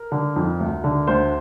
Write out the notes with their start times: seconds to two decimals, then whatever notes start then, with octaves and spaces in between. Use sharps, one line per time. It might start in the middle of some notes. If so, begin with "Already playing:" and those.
Already playing: A#4
0.12 D3
0.36 F2
0.60 D2
0.84 D3
1.07 D2 C5